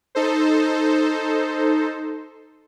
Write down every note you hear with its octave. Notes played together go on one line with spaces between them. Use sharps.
D#4 A4 C5